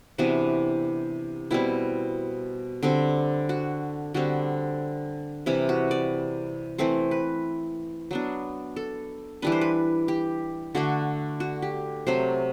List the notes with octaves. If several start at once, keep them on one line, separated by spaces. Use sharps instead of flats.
C3 E3 B3 D4 F#4
B2 G3 C4 E4
D3 G3 C4
F#4
D3 G3 C4 F#4
C3 E3 G3 E4
F#4
D5
E3 A3 C4 C5
B4
F#3 B3 D4
A4
E3 G3 D4 B4
C5
B4
G4
D3 A3 D4 F#4
F#4
G4
C3 F#3 A3 C5